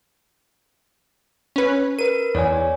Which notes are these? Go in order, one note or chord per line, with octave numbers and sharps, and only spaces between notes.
C#4 B4
A#4 B4 D#7
E2 C#5 D5 G#5